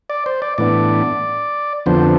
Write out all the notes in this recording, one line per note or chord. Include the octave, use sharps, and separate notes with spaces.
D5
C5
D5
A2 E3 B3 D4 D5
F2 D3 F3 B3 D4 C5